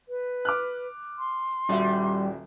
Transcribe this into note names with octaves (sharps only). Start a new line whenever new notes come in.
B4
D6 F6 F#6
C6
D#1 G3 F#4 E5